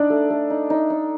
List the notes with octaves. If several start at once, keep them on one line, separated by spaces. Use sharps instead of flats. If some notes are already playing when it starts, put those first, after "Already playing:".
Already playing: D4 D#4 D5
A3
A3
D#4
D#4
D#4